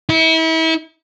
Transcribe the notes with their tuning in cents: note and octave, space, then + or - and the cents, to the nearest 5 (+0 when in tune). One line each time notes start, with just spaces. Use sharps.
E4 -35